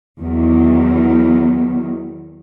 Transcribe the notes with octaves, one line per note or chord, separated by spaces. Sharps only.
E2 D#3 F#3